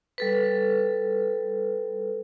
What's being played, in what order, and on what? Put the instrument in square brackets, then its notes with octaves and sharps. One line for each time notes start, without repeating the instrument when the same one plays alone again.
[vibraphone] G3 A4 B4